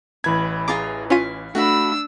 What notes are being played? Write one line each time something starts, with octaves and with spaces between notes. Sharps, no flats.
A1 E3 B5 G#6
F4 G#4 A#5 D6
C#4 E4 F4 F5 D#7
A3 D4 F#4 F5 B5 E6